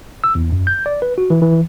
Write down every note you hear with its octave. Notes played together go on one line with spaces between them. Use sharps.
E6
E2
F#2
G6
D5
B4
F#4
E3
E3